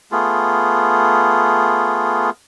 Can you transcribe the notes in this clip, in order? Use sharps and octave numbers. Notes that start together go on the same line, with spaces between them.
A3 B3 F4 G#4